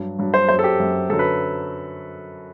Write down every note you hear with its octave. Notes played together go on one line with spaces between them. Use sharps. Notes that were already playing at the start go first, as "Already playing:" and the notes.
Already playing: G2 F#3
G2 F#3
C5
F#2 F#3 C5
A4
G4
F#2 F#3
F#2 D3 F#3 A4
B4